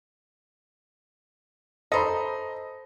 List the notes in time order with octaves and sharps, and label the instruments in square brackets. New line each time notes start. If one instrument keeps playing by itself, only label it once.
[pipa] A4 C5 [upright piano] D#5 A#5 B5